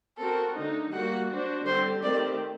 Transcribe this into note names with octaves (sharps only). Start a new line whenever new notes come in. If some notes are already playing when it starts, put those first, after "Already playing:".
C4 F#4 A4 A#4
D3 A3 D#4
G3 A#3 F#4 F#5
D4 F#4 C5
D3 G3 C4 G4 C5
D#3 A3 C4 G4 D5